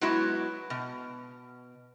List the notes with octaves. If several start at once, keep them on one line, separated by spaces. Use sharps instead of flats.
F#3 G#3 B3 E4 F#4
B2